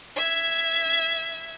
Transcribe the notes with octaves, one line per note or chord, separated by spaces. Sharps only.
E5 G#6